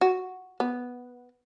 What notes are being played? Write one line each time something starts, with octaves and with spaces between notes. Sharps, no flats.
F#4
B3